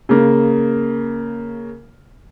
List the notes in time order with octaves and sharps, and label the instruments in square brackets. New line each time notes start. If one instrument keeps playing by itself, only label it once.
[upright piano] C#3 A#3